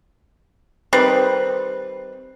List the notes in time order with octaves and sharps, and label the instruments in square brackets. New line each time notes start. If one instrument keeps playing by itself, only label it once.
[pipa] D#3 G3 C4 B4